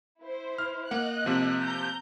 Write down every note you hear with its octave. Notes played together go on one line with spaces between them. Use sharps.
E4 C5
F6
A#3 D#5 F#5 F#6
C3 F3 A#3
A#5 G6